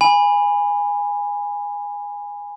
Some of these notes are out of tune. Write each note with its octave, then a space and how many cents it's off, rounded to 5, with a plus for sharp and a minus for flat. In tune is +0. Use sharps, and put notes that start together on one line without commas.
G#5 -15 B5 +0